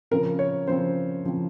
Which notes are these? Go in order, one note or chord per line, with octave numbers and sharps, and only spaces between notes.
C#3 F3 C4 A#4
C#5
C#3 F3 C4 C5
C#3 F3 C4